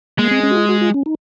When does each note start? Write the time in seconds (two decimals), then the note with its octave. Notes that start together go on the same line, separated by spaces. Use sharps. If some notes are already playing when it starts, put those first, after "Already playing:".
0.19 G#3 A#3
0.31 C4
0.43 C#4
0.51 F#4
0.57 F4
0.69 F#4
0.81 F4
0.94 C#4
1.06 D#4